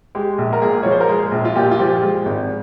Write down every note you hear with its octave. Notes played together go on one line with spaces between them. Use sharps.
G#3 G4
A#1
A#4
A#2 G#4
F3 C#5
C5
A#4
G#3 G#4
A#1
F4
A#2 G4
F4
F3 G4
G#3
G#1